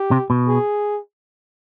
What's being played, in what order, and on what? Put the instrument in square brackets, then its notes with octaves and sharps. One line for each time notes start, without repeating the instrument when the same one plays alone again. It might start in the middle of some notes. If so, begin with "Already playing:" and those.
Already playing: [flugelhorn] G4
[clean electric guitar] C3
B2
[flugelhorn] G#4